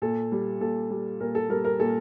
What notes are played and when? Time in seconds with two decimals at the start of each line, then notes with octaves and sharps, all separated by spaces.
0.02 A#2 A4
0.32 G3
0.60 A#2 A4
0.90 G3
1.20 A#2 A#4
1.35 A4
1.49 G3 A#4
1.65 A#4
1.79 A#2 A4